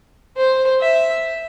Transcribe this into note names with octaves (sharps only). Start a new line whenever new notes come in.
C5
E5